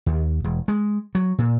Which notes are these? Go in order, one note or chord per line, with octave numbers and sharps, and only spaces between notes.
D#2
E1
G#3
F#3
A#2